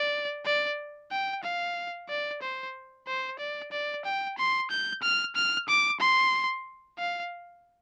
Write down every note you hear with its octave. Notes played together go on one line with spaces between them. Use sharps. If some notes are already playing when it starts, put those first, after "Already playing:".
Already playing: D5
D5
G5
F5
D5
C5
C5
D5
D5
G5
C6
G6
F6
F6
D6
C6
F5